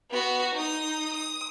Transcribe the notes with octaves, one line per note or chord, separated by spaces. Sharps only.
B3 F#4
D#4 D#6
D#6